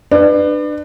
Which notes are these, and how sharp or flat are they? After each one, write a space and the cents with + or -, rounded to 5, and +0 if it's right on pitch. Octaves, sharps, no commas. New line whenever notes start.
D4 +30 B4 +10